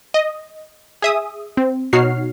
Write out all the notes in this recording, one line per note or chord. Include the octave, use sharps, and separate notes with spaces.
D#5
G#4 E5 D#6
C4
B2 D#4 F#4 C#5 F6 C7